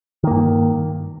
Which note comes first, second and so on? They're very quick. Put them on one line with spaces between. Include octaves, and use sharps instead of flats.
D#3 A#3 G2